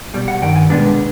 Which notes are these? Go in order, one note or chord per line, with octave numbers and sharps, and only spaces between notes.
C2 B2 G3
F#5
G2 D#3 G5
G#5
C2 B2 G#3 B3 D4 A5